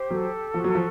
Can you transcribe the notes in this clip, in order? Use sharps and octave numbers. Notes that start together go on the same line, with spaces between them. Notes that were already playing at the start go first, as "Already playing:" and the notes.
Already playing: G4 C5
F#3 A4
F3 F#4
F#3
F3